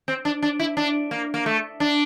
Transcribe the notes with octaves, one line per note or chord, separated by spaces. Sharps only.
C4
D4
D4
E4
D4
A#3
A#3
A3
D4